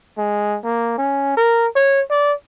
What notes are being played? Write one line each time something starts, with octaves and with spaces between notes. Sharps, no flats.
G#3
A#3
C#4
A#4
C#5
D5